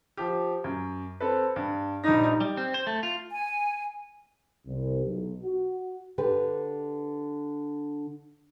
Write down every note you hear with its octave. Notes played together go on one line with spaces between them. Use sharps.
F3 G4
F#2
C4 A4 B4
G2
A#1 G3 D#4 A#6
G3
C4
C5
A3
F4
G#5
C2
B1
F#4
D3 G4 B4